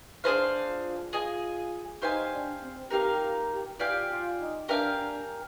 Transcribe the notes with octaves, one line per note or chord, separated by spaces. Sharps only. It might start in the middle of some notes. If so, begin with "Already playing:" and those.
D4 G#4 C5 F5
F4
F4 G#4 D#5 G#5
D#4 G4 C5 F5 G#5
D4
C4
A#3 D#4 G4 A#4 F5
F4
G4
F4 G4 D5 F5 G#5
F4
D#4
D4 G4 A#4 F5 G#5
D4